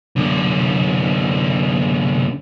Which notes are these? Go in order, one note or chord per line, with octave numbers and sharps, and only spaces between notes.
F#2 D3